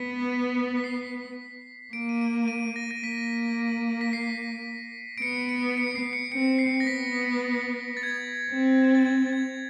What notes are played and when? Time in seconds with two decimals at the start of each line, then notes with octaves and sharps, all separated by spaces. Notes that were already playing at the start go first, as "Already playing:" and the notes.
Already playing: B3 B6
0.77 B6
0.84 C7
1.93 A#3 D7
2.09 D#7
2.21 D7
2.48 D#7
2.76 A#6
2.91 A#6
3.04 A#3 B6
4.01 B6
4.13 C7
5.18 D7
5.22 B3 C#7
5.49 D7
5.77 C#7
5.95 C7
6.13 C#7
6.31 C4 C#7
6.59 C7
6.80 A#6
6.86 B3 B6
7.97 A6
8.03 G#6
8.10 A6
8.51 C4
8.95 A6
9.06 G#6
9.26 A6
9.33 G#6